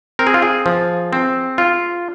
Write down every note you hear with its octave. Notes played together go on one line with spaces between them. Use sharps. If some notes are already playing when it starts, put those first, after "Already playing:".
C4 A#4
G#4
F4
G#4
F3
C4
F4